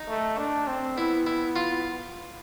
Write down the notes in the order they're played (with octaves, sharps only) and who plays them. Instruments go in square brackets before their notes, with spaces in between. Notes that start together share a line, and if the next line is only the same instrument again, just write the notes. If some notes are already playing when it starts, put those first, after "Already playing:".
Already playing: [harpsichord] D#4
[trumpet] A3
D4
C4
[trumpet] B3 [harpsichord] E4
[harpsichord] E4
F4